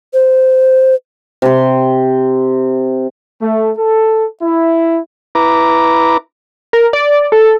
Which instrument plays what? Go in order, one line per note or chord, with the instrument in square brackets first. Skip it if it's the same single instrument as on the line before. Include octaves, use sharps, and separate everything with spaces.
[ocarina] C5
[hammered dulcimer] C3 C6
[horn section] A3
A4
E4
[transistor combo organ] E4 B4 A#5 D6
[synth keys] A#4
D5
A4